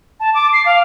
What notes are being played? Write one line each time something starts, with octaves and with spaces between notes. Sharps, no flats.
A5
D6
C7
F5